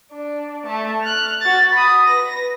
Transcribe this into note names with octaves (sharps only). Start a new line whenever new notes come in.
D4
A3 A5
F6 F#6
F#4 A6
B5 D#6
B4 A#6